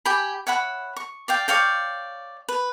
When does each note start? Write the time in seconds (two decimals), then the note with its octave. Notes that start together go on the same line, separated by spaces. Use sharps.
0.05 G4 G5 G#5 B5
0.47 C#5 E5 F#5 B5
0.96 C#6
1.28 D5 F5 G5
1.48 C#5 D5 F5 G5
2.49 B4